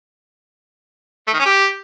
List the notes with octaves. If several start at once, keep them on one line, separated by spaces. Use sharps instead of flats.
A3
D#3
C#4
G4